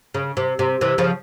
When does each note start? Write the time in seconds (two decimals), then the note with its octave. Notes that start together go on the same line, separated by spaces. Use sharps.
0.14 C#3
0.37 C3
0.59 C3
0.81 C3 E3
0.98 C#3 F3